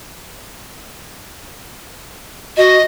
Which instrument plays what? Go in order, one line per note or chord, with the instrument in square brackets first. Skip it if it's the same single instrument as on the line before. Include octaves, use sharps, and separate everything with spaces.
[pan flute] F#4 [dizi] D#5